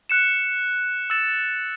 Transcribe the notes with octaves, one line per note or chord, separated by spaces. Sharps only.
F#6 C#7 E7
E6 A6 E7